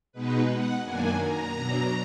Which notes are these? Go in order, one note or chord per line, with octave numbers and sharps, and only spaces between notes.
B2 G#3 B3 D#4 B4
F#5
F#2 D#3 A#3 D4 G#5
A#5
B2 F#3 D4